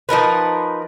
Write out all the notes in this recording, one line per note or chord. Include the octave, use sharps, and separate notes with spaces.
F3 D#4 A#4 B4